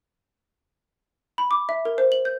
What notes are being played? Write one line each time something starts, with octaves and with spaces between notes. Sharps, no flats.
B5
D6
E5
A#4
C5
F#7
G6